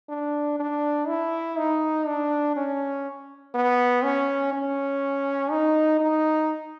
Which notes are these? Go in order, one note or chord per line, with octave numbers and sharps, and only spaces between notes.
D4
D4
E4
D#4
D4
C#4
B3
C#4
C#4
D#4
D#4